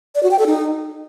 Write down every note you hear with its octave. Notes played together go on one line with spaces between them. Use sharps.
D5
F#4
G5
A4
D#4